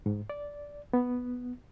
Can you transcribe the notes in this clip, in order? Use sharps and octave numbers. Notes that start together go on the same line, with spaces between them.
G#2
D5
B3